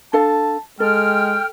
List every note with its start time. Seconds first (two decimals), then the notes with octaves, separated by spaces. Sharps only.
0.13 D4 A4 F5 A5
0.80 G#3 A4 G5 F6